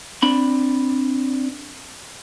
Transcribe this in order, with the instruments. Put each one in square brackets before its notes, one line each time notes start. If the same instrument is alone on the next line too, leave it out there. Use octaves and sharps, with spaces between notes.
[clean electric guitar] C4 D4 B5